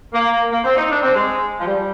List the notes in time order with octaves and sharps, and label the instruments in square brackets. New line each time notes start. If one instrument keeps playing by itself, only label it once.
[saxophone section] A#3
A#3
C4
D#4
D4
C4
G#3
F3
G3